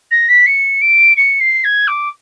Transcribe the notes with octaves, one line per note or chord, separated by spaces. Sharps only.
A#6
B6
C#7
D7
C#7
C7
G#6
D6